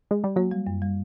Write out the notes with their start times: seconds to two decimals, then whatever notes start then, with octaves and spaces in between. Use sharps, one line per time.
0.11 G#3
0.24 G3
0.36 F#3 A#3
0.51 G3
0.67 F#2
0.82 G3